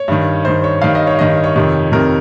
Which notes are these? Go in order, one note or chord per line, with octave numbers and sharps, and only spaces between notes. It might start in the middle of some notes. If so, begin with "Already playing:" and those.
Already playing: C#5
G2 D#3
G2 D#3 C5
C#5
G2 D#3 F5
D#5
C#5
G2 D#3 D#5
C#5
F2 C3 D#3
F2 C3 D#3 A#4